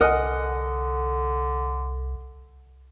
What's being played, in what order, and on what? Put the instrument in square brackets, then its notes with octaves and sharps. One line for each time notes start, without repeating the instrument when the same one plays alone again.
[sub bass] C2 [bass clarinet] D3 [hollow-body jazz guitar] A#4 G#5 [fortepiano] D#5 F#5